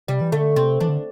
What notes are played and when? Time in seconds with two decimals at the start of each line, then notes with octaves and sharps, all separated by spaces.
0.08 C3 G3
0.21 E3
0.32 D3 A3
0.56 C3 C4
0.80 E3 D4
0.89 D3